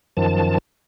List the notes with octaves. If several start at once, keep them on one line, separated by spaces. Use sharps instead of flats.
F#2 D#3 F3 A5